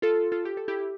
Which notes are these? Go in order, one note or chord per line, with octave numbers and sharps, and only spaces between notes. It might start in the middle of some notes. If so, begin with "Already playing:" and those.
F4 A4
F4 A4
G4
A4
E4 G4